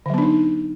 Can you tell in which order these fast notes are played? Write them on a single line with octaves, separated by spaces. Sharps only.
D3 F#3 B3 D4 D#4